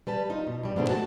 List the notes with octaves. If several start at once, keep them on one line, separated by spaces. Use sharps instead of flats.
G3 B4 A5
D#4 F4
B2
G2 G3
G#2 B2 D3 A3 B3 C4
A3 F#4 A5